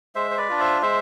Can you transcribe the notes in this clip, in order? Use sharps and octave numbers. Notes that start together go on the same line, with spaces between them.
G#3 C5 E5
C5
B4 D5
D4 F4
C5 E5
G#3 C5 E5